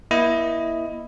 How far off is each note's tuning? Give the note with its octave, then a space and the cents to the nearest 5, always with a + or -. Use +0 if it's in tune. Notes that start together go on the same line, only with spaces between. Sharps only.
A#3 +45 E4 +0 D#5 +0